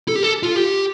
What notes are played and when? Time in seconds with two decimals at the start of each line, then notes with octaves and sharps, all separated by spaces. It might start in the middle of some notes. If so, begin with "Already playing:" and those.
0.08 A4
0.16 G4
0.23 A4
0.43 F4
0.55 G4